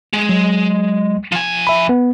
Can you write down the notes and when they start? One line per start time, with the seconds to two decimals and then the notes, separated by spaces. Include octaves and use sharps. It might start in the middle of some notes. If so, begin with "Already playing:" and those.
0.13 G#3
0.29 F#3
1.32 F3 G#5
1.67 E5 B5
1.89 B3